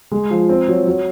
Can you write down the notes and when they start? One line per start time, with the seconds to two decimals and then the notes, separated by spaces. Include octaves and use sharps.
0.11 G#3
0.30 F3
0.49 C4
0.68 F#3
0.87 F#3